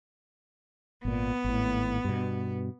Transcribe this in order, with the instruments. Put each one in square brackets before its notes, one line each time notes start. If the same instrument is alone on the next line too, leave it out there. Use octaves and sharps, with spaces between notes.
[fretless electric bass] G#1 A#2 [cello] B3
[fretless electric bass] G#1 A2
G2 B2